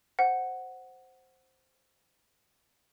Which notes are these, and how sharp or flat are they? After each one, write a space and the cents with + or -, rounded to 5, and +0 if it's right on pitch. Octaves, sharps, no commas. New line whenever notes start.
C5 +0 F#5 +0